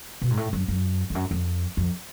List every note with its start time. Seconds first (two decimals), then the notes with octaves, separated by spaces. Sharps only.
0.22 B2
0.30 G#2
0.37 A2
0.53 F#2
0.68 F#2
1.10 F2
1.15 F#2
1.31 F2
1.77 F2